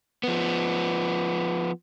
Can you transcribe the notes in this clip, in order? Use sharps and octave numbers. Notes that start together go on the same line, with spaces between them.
F3 B3